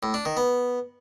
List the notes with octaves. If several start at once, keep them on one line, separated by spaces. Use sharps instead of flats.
A2
D4
D#3
B3